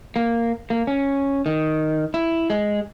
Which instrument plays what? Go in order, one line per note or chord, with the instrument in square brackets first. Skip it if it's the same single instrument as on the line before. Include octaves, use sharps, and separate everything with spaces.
[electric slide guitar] A#3
A#3
C#4
D#3
E4
G#3